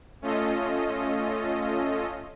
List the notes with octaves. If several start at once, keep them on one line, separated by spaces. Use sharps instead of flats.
A3 C#4 F4 A4 D#5